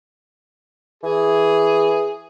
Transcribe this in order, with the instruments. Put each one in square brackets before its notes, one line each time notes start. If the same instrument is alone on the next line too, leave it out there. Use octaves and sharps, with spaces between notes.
[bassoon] E3 [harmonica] G#4